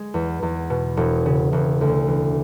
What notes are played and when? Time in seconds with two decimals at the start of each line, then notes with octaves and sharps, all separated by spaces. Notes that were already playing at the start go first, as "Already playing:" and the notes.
Already playing: G#3
0.14 E2
0.42 E2
0.70 B2
0.97 E1
1.26 C#3
1.53 E1
1.81 D2
2.08 E3